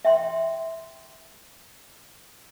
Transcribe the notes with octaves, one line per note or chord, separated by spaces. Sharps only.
E5 G5 C6